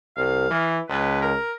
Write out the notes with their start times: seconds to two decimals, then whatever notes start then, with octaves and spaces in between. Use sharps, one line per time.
0.17 C2 F5
0.51 E3
0.89 C#2 B4
1.22 A#4